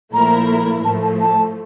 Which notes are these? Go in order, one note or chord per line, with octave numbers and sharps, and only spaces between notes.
A#2 F3 A3 E4 A#4 A#5
A2 F3 A3 A5
A5
A5